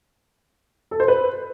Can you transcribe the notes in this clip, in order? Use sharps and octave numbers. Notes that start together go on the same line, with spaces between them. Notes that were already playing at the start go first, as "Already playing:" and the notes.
A4
C5
B4